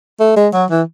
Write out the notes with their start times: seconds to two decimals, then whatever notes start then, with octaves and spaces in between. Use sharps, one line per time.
0.20 A3
0.36 G#3
0.53 F#3
0.70 E3